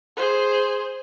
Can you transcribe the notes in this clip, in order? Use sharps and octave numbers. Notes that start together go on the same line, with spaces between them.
G#4 C5